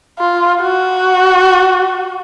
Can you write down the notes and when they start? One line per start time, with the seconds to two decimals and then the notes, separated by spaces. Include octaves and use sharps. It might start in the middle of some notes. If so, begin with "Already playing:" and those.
0.19 F4
0.61 F#4